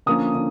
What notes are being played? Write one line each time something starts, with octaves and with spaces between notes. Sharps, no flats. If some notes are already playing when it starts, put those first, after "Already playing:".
D3 F3 A#3 C#4 D#6
D3